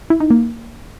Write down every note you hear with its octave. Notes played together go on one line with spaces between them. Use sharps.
E4
D#4
A#3